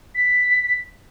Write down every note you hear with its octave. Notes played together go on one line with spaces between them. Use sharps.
B6